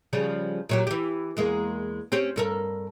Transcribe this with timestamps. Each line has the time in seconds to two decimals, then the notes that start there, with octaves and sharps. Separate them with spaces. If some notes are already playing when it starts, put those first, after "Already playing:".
0.13 C#3 F3 G3
0.69 A#2 F#3 G4
0.87 E3 G4
1.37 E2 G#3 A#3
2.12 C4 C#4 G4
2.36 G2 A4 A#4